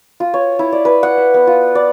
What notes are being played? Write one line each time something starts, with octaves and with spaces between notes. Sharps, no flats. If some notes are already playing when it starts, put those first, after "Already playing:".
F4
C#5
E4
D5
B4
F#5
E5
B3
F4
D5